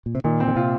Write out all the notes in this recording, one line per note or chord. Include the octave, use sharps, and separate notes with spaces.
A#2
C3
A#2 D#3
C4
D#3
C3 F4